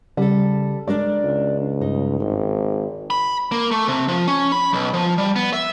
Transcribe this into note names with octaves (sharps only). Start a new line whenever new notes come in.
C#3 G3 A4
G#3 D4 A#4 D5
C#2
G2 D#4
G#1
B5
A#3
A3
C3
F3
C#4
B5
B1
F3
G3
B3
E5